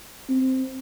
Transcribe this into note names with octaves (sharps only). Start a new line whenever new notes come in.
C4